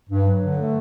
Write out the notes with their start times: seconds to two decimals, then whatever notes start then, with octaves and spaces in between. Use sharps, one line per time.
0.10 G2
0.26 F#3
0.43 D3
0.58 A3